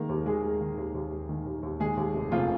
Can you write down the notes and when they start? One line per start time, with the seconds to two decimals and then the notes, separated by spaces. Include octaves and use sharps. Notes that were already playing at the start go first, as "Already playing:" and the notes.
Already playing: D#3 G#3 A#3 A#4
0.09 D#2
0.26 D#2 G#3 G#4
0.44 G#3
0.61 D#3
0.78 D#2
0.95 D#2
1.12 G#3
1.29 D#3
1.46 D#2
1.63 D#2
1.80 D#3 G#3 G#4
1.97 D#2
2.14 F1
2.31 F1 F3 F4